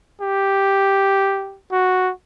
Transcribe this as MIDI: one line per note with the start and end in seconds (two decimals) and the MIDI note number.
0.21 1.58 67
1.72 2.11 66